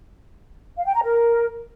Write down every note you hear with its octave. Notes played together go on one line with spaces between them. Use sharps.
F5
G5
A#5
A#4